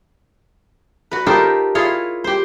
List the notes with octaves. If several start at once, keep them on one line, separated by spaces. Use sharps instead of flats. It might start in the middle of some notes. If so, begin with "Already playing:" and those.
F#4 B4
D#4 F4 G4 A4 A#4 C5
E4 F4 G#4 C#5
G4 C5